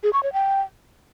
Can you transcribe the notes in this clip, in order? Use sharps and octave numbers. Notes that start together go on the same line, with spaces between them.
G#4
C#6
C#5
G5